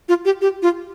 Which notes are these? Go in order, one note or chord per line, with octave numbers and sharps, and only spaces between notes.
F4
G4
G4
F4